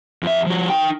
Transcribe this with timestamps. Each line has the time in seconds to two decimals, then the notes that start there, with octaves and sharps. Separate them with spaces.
0.23 F2 E5
0.46 F3 F#4
0.70 D#4 G5